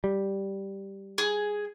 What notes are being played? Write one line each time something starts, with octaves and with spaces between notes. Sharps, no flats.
G3
G#4